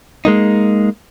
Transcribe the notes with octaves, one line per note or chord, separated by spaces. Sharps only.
G#3 A#3 D#4